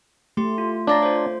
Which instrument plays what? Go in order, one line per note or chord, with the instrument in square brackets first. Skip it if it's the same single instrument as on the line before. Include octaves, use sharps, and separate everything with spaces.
[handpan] A3 [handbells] G4 C6
[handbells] F4
[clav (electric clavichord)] D4 D5 A#5 [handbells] C#5 F5 A6
[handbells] F4 C5